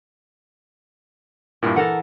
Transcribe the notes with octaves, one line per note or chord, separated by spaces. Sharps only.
G2 A#2 G3 A#3 E4
E3 A4 A#4 F#5